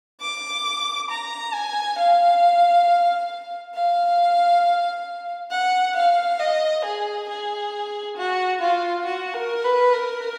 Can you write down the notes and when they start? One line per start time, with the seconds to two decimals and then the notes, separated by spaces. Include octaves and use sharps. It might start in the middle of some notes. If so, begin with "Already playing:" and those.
0.21 D6
1.10 A#5
1.54 G#5
1.98 F5
3.74 F5
5.51 F#5
5.97 F5
6.39 D#5
6.85 G#4
7.29 G#4
8.17 F#4
8.61 F4
9.06 F#4
9.34 A#4
9.64 B4
9.93 A#4